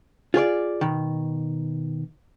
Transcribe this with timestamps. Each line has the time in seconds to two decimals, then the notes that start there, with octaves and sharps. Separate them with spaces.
0.34 F4 G#4 C#5 D5
0.81 B2 D#3